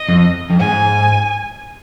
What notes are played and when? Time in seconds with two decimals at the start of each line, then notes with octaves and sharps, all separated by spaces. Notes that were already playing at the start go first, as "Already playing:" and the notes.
Already playing: D#5
0.09 F2
0.50 F2
0.59 G#2 G#5